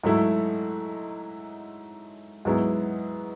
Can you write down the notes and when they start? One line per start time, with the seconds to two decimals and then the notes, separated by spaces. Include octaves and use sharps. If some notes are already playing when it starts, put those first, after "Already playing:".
0.04 G#2 F#3 A3 E4
2.45 G#2 F#3 B3 E4 G#4